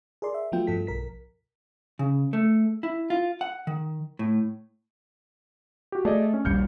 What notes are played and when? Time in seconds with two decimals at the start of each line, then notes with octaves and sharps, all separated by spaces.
0.22 G#4 A#4 D5 C6
0.34 E5
0.52 F3 F#3 A3 B3 F4 G5
0.67 G2 F3 A4 B6
0.87 B1 A#4 B6
1.99 C#3
2.33 A3
2.83 E4
3.10 F4
3.41 F#5
3.67 D#3
4.19 A2
5.92 F#4 G4
6.05 A3 G#4 D5 D#5
6.34 C#4
6.45 D#1 A#1 G3 F6 G6 C#7